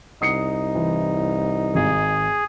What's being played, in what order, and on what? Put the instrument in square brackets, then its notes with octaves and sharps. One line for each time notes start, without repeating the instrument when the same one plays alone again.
[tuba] C2 [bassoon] D#4 [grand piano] D#6 C7 C#7
[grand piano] E3
[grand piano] G#1 [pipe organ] G#4